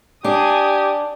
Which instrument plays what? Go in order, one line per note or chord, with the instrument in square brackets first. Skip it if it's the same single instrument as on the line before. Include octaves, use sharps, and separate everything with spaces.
[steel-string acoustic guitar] D4 [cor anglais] G4 [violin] G#5 D#6